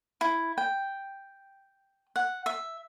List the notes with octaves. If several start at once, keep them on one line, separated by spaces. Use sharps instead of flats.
E4
G5
F#5
E5